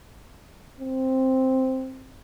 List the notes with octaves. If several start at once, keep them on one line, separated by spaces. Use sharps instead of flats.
C4